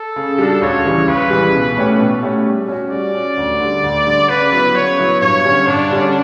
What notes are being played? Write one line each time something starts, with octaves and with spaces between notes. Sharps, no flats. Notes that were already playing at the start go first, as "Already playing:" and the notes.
Already playing: A4
C#3
G3 D4 F#4
C#2 C#5
C#3 E3 G3
C#2 B4
C#3 E3 G3
B2
A3 C#4 G4
B2
A3 C#4 G4
G3
C#4 F#4
G3 D5
C#4 F#4
D2
D3 G3
D2
D3 G3
C#3 B4
F#3 B3 E4
C#3 C#5
F#3 B3 E4
G2 C#5
D3 G3 C#4
G2 D4
D3 G3 C#4